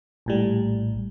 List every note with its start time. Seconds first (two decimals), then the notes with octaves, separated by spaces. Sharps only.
0.26 A#1 A2 G3